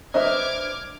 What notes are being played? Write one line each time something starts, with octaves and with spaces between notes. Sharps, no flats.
D4 B4 C5 D#5 E5 D6 F6 G#6